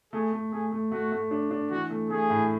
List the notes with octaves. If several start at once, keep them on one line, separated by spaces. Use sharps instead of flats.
A3 G#4
A3
A3 G#4
A3
A3 F#4
A3
D4
D4
E3 F#4
A3
A3 G#4
A2